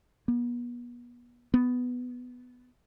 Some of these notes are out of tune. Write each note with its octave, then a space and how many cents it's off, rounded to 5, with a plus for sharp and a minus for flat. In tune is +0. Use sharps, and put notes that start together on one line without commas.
B3 -35
B3 +5